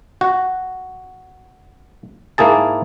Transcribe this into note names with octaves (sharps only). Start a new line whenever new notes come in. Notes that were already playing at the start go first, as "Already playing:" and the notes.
F#4
G#2 A#3 E4 G#4 A5